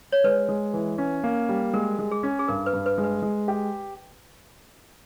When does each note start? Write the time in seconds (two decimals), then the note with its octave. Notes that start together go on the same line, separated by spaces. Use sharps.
0.12 C#5
0.24 G#3 B4
0.49 G#3
0.74 E3
0.98 C#4
1.24 A#3
1.49 G3
1.73 G#3 A#4
1.99 G#3
2.11 G#4
2.23 C#4
2.39 G#4
2.48 G2 A#4
2.66 B4
2.73 G2
2.86 B4
2.98 G#3
3.04 B4
3.22 G#3
3.48 G4